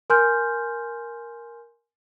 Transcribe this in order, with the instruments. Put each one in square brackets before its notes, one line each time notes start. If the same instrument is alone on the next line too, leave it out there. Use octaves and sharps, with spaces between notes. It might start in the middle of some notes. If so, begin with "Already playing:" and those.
[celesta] A#4 G#5 C6 F6 G6